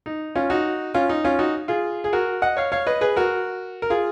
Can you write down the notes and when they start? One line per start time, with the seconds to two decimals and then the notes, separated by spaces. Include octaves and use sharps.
0.06 D#4
0.36 C#4 F4
0.50 D#4 F#4
0.94 C#4 F4
1.09 D#4
1.24 C#4 F4
1.39 D#4 F#4
1.68 F4 G#4
2.04 G#4
2.13 F#4 A#4
2.42 D#5 F#5
2.57 C#5 F5
2.72 C#5 F5
2.87 B4 D#5
3.01 G#4 B4
3.16 F#4 A#4
3.82 A#4
3.90 F4 G#4